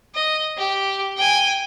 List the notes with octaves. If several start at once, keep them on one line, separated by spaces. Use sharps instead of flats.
D#5
G4
G5 G#5